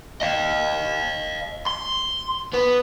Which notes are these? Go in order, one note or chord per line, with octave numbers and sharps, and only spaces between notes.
D#5 F5
C6
B3